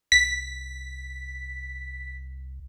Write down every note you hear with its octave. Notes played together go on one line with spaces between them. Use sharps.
C2 B6